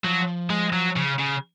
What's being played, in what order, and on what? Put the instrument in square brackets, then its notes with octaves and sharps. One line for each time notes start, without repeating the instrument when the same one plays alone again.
[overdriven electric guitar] F3 [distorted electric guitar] F#3
[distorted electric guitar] G#3
F#3
C#3
C#3